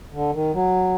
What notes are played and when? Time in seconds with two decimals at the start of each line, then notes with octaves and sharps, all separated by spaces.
0.13 D3
0.33 D#3
0.53 F#3